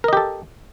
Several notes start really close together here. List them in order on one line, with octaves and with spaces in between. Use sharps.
A#4 D#5 G4 A4